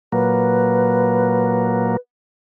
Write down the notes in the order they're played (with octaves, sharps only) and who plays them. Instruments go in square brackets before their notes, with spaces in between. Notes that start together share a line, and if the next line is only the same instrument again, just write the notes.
[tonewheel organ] A#2 F#3 A#3 [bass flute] B4